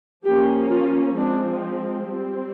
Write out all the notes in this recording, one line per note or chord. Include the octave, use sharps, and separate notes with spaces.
F3 A#3 C#4 G4
F4
F3 G#3 C4 D4
G3 C4